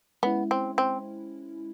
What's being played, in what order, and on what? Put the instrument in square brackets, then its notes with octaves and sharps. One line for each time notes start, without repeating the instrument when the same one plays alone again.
[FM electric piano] G#3 C#4 E4 [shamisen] B3
[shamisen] C4
C4